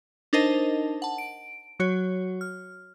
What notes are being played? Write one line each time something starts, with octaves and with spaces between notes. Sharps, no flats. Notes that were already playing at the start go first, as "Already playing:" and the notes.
D4 D#4 A#4 C5 D#5 A5
F#5 A5
D7
F#3 F#4 C#5
F6